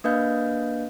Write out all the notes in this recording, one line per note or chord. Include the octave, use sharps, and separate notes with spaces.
A#3 D4 B4 D#5 F5 G6